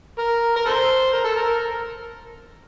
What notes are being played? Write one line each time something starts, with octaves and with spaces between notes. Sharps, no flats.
A#4
A#4
A4 C5
A#4
A4
A#4